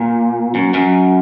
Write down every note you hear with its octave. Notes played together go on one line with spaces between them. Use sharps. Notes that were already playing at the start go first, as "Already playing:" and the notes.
Already playing: A#2
F#2
F#2